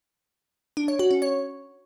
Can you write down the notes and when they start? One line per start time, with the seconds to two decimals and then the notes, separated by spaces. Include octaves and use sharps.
0.77 D4
0.88 C#5
0.99 F#4
1.11 C#4
1.22 C#5